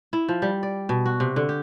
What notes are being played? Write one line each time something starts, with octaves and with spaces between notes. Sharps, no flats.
E4
F3
G3
D5
B2
F#4
C3
D3
G4